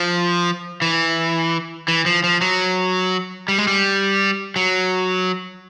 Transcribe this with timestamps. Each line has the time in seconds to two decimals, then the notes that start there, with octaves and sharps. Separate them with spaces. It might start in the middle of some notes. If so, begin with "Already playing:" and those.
Already playing: F3
0.82 E3
1.88 E3
2.06 F3
2.24 F3
2.41 F#3
3.48 G3
3.58 G#3
3.67 G3
4.56 F#3